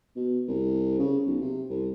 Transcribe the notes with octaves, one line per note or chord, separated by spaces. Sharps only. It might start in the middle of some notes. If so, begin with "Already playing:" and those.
B2
C2
C#3
B1
C3
C2